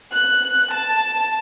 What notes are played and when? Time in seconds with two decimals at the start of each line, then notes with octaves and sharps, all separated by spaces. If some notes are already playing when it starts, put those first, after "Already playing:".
0.12 F#6
0.72 A5